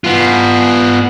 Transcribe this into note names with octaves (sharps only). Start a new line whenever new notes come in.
B3 F4